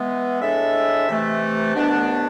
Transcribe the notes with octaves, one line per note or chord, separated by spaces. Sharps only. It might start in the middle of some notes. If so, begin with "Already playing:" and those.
Already playing: E3 G#3 B3
A2 G#3 D4 A4 E5
C3 E3 A3
C2 B2 B3 D4